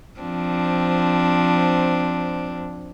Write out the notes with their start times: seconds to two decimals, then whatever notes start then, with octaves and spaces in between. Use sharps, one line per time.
0.20 F3 C4 D4